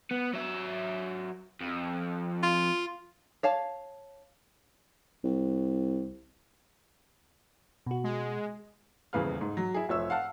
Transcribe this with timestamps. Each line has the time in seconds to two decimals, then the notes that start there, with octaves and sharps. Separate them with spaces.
0.11 B3
0.34 F#3 E5
1.61 F2
2.43 F4
3.43 C#5 F5 A5
5.24 C2
7.87 B2 F#4
8.04 G#3
9.13 D#1 E2 C#3 B4 F5 F6
9.41 G#2
9.57 F#3
9.74 E4 G#4
9.89 F1 F3 C#5 E5 E6
10.10 F5 F#5 A5 F6